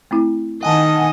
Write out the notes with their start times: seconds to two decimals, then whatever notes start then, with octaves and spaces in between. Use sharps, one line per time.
0.11 A3 C4 E4
0.63 D#3 D#5 F#5 G#5 A5